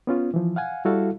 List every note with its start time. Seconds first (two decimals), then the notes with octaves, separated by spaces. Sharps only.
0.07 B3 C#4 F4
0.34 E3 F3
0.56 F5 F#5 G#5
0.85 G3 E4 F#4 A4 F5